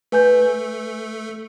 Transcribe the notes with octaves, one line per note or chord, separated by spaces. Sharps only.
A3 B4 G#5 G6